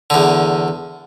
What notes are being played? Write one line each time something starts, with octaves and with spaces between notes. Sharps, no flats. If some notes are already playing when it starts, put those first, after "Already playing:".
E2 D3